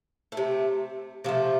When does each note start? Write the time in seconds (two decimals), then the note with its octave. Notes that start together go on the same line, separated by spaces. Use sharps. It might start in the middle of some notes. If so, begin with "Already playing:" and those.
0.32 A3
0.37 C3
1.24 C3 F3 A3